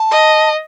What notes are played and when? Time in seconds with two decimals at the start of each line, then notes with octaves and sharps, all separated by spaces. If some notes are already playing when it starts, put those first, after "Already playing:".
Already playing: A5
0.11 D#5